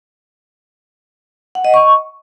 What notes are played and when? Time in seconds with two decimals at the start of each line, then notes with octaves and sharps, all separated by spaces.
1.55 F#5
1.64 D#5
1.74 C#6